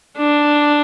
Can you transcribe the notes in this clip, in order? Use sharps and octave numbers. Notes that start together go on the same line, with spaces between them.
D4